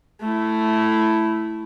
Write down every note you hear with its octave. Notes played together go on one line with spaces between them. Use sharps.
A3 E4